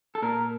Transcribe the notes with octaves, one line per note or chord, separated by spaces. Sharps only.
A4
A#2 A#4